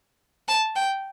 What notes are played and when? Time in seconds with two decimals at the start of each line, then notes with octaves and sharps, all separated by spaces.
0.48 A5
0.76 G5